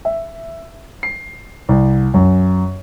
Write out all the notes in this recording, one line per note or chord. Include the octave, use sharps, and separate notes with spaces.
E5
C7
C2
F#2